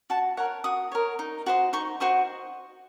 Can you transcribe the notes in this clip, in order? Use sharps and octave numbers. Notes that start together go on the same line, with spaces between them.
F#4 A5
A#4 C#5 F#5
F#4 D#6
A#4 C#5
D#4
F#4 C5 D#5
D#4 C#6
F#4 C5 D#5 C#6